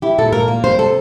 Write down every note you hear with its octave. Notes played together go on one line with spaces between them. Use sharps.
E4 G4
A#2 A4
A#2 A#4
A#3
G3 C5
C3 A4